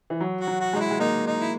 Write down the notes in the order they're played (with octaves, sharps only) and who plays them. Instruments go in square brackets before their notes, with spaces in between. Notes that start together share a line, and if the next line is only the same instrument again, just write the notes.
[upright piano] E3
F#3
[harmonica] F#4
[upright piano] F#3
[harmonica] F#4
[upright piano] G#3 [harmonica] D#4
[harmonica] E4
[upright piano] G#3
[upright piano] A#3 [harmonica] D#4
[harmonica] D#4
E4